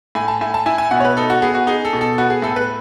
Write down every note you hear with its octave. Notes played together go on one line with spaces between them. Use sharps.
A2 G#5
A5
A2 G#5
A5
E4 G#5
G#5
B2 F#5
C#5
B4
D#4 A4
F#4
B3 G#4
F#4
D#4 G#4
A4
B2
A4
B3 F#4
G#4
A2 A4
B4